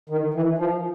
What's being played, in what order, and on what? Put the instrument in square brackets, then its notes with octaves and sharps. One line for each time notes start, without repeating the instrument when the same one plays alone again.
[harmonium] D#3
E3
F3